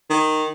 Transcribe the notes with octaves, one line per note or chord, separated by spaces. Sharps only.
D#3